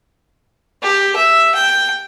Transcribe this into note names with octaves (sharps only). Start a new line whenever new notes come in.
G4
E5
G5